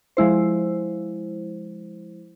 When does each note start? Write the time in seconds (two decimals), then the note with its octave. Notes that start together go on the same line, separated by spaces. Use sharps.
0.17 F3 G#3 E4 C5